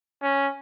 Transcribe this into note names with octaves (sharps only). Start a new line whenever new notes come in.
C#4